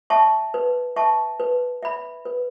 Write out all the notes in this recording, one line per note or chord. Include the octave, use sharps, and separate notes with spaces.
E5 A5 C#6
B4
E5 A5 C#6
B4
E5 B5
B4